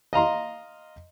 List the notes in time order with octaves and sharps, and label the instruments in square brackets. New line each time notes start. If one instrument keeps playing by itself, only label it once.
[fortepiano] D#5 F5 A#5 C6